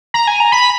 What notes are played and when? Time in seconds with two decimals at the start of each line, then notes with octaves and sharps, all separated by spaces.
0.14 A#5
0.27 G#5
0.40 A#5
0.52 B5